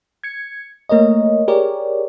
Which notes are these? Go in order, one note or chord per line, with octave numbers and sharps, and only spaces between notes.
G#6 C#7
A3 A#3 A#4 C#5 D#5
G4 G#4 A#4 C#5 D5